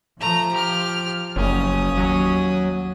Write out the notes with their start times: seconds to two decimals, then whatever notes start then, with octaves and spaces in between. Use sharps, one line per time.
0.20 F3 A3 A#5
0.52 G4 F6
1.36 F#1 C#4 D#6
1.97 D#2 F#3